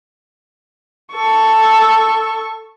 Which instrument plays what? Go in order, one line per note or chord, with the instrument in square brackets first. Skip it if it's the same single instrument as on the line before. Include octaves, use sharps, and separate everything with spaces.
[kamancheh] A4 C#6